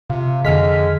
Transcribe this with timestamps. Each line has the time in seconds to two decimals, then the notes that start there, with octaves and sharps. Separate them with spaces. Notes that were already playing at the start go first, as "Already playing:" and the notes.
0.10 C3 F4
0.45 F2 D3 G#3 F6 B6